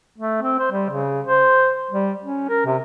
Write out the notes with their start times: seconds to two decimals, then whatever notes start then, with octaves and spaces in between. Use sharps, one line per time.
0.18 A3
0.42 C4
0.59 C5
0.72 G3
0.90 C#3
1.27 C5
1.90 G3
2.24 C#4
2.49 A#4
2.66 C3